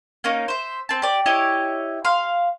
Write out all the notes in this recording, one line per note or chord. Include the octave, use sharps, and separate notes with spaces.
A#3 C#4 D#4
C5 E5
C4 A5
G4 D5
E4 G4 C#5 D#5
F5 C6